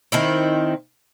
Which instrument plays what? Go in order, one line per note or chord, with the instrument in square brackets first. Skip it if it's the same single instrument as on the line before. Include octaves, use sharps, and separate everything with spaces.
[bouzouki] D#3 C4 E4